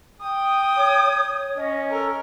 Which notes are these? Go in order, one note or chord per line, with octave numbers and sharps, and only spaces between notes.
G5 D#6
C#5
C#5
C#4 D#5
A4 A#4